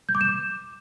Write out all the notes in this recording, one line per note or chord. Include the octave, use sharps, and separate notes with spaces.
G6
D6
E7